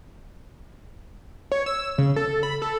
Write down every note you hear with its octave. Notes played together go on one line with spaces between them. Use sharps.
C#5
E6
C#3
A4
B5
A4